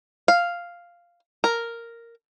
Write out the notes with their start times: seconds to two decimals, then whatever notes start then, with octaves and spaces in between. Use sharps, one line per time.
0.28 F5
1.44 A#4